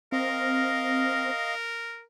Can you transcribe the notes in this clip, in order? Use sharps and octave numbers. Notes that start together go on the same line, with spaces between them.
C4 A#4 D#5 F5